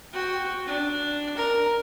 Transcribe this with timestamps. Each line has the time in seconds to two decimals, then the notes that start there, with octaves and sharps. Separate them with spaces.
0.13 F#4 G5
0.66 D4
1.37 A#4